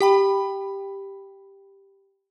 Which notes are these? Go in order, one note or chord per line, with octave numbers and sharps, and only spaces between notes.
G4 G5 B5